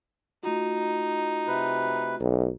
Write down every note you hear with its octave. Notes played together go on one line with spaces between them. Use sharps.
A3 D#4 F4 F#4
C3 B4
B1